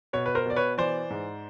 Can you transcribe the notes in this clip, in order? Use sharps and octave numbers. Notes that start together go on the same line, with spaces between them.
B2 B4 C#5
B4
A#4 C5
B2 D5
B4 C#5
E3 C5 D5
G#2